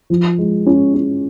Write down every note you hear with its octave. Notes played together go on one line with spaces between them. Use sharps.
F3
G#3
C#4
C#4